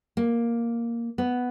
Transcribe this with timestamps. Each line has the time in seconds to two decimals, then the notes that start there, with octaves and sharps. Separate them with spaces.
0.17 A#3
1.18 B3